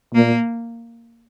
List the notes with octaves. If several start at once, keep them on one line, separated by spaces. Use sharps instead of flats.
A#2 A#3